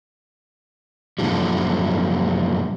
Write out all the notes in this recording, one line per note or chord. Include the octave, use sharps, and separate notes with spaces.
F#2 A#2 D3 F3 G3